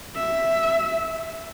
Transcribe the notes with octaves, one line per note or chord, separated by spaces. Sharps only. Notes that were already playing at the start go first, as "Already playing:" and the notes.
E5